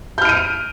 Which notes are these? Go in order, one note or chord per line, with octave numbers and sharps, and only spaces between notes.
F6 G6 D7 D#7